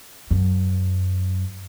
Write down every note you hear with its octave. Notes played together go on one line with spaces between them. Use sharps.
F#2